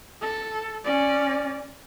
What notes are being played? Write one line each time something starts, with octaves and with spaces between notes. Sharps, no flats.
A4
C#4 D5